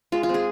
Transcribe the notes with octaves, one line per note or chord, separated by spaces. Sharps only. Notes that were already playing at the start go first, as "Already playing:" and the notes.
G#3 F4
F4
C4
G#4